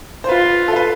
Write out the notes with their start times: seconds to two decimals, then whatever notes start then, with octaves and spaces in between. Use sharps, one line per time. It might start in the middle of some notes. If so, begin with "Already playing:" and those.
0.24 C5
0.29 F4 B4
0.68 A4
0.76 B4